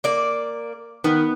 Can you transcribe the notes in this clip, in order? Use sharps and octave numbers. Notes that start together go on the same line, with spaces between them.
A#3 D5
D#3 B3